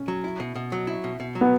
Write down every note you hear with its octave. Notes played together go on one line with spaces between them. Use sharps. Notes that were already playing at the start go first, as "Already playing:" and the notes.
Already playing: C#4
F#3
E4
B2
B2
F#3
E4
B2
B2
F#3
B3